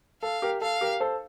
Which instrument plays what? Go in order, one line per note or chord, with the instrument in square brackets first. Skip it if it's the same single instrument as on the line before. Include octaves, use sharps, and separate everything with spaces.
[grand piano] A4 [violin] F5
[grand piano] G4 A#4
[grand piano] A4 [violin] F5
[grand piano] G4 A#4
A4 C5